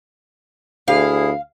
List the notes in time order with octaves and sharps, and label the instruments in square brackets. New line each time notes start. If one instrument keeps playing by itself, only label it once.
[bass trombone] D2 [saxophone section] E4 G#4 [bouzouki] F5